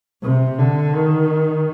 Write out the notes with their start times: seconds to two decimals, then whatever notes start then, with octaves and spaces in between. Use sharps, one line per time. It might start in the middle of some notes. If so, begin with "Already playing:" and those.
0.23 C3
0.59 D3
0.95 D#3